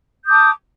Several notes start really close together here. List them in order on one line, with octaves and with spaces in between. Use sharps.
G6 D#6 D6 A5